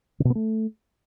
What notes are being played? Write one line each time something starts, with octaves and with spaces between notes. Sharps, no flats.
C#3
B2
B3
A3